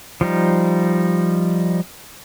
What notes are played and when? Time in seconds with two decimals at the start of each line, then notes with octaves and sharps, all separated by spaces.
0.21 F3 G3 D#4